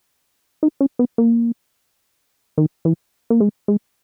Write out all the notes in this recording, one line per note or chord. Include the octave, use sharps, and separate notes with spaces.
D#4
C#4
B3
A#3
D#3
E3
A#3
G#3
G#3